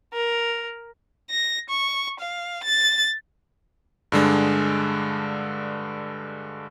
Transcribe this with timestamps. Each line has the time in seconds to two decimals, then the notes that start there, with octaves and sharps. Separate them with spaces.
0.14 A#4
1.31 A#6
1.70 C#6
2.20 F5
2.64 A6
4.12 G2 D3 G#3 D4